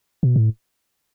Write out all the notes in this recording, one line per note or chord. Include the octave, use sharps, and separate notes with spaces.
B2
A2